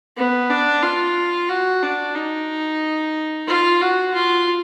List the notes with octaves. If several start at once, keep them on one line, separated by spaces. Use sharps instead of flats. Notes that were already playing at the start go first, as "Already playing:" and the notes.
B3
D4
F4
F#4
D4
D#4
F4
F#4
F4